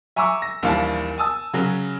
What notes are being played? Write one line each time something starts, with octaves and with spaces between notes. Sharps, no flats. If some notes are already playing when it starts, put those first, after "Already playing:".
E5 G#5 A#5 C#6 D6 E6
A#6
A#1 D#2 E3 G3 F5 A5
G#5 A5 D#6 E6
C#3 F#3 C#4